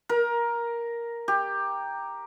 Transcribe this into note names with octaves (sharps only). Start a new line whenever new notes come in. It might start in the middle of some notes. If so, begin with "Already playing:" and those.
A#4
G4